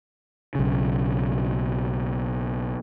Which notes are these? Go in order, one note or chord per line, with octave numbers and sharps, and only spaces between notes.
B1 C#3